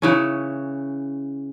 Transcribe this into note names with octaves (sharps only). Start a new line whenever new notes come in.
C#3 E3 C#4